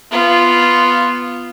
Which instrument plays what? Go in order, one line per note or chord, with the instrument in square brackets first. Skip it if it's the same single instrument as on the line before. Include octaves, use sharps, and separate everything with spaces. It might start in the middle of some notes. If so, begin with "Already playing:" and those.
[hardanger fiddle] B3 F4